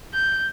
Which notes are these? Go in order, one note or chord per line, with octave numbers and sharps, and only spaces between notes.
G6